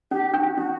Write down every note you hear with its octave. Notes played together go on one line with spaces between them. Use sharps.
C#4 G4
D4 F#4
C#4 F#4